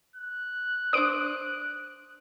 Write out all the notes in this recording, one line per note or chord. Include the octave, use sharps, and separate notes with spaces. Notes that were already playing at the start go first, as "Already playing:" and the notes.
F#6
D4 C5 D5 D#6 D7